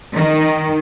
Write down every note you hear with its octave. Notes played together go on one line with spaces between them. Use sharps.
D#3